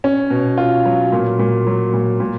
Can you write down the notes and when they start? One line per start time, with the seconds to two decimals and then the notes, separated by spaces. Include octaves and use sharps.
0.04 C#4
0.30 B2
0.58 F4
0.85 F#3
1.12 A#2
1.39 A#2
1.67 F#3
1.94 A#2
2.20 A#2